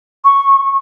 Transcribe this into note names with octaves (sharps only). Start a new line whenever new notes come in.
C#6